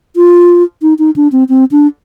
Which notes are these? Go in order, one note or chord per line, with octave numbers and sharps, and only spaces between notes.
F4
D#4
D#4
D4
C4
C4
D4